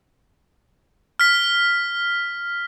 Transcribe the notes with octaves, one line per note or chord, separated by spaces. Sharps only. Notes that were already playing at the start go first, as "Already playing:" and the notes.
F6 B6